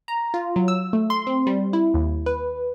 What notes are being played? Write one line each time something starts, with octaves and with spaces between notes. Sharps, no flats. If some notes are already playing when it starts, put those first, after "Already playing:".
A#5
F4
F#3
E6
A3
C6
C4
G3
E4
D#2
B4